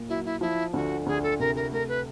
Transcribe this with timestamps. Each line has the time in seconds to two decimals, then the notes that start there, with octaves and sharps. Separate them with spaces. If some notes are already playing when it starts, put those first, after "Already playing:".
Already playing: A#2
0.09 F#3 E4
0.25 E4
0.41 F3 E4
0.73 D2 F#4
1.06 D2 G#4
1.23 A4
1.39 C3 A#4
1.56 A#4
1.72 A3 A#4
1.89 B4